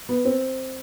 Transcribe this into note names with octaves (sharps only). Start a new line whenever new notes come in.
B3
C4